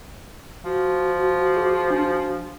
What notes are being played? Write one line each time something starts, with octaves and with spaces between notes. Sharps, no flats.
F3 F#4
G#4
D4